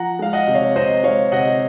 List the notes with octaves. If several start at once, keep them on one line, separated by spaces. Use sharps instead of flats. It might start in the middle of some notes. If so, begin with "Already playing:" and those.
Already playing: F3 F#5 A#5
G#3 F5
D#5 F#5
C3
C#5 F5
C3 C5 D#5
G#3 C#5 F5
C3 D#5 F#5